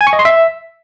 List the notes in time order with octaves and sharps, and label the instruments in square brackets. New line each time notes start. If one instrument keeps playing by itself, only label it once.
[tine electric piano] G#5
C#6
D#5
C6
E5